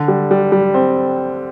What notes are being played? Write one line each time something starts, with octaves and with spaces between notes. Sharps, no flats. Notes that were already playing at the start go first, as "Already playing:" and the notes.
Already playing: D3
G3
G3
G3
C4